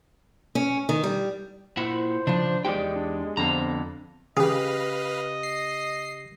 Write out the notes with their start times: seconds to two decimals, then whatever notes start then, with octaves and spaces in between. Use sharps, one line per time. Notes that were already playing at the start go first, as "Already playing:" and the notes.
0.55 C#4
0.89 D#3
1.04 G3
1.77 A#2 E4 C5 F#5
2.27 C#3 F3 D4
2.65 E2 G#3 D#4 G4 D5 G5
2.96 D4
3.37 F2 D3 F3 B3 A#5
4.37 C#3 G4 G#4 B4 D#5 F5
5.43 C7